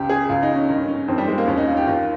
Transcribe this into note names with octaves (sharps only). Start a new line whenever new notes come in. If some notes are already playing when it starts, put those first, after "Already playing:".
Already playing: C#2 C#3 G4
G#4
C#2 C#3 F4
D#4
C#4
G2 D#3 D#4
C#4
F2 D#3 C4
G3
G#3
A#3
D#2 D#3 C#4
D#4
F4
G4
D#2 D#3 F4